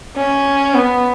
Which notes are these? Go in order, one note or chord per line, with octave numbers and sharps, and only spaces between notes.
C#4
B3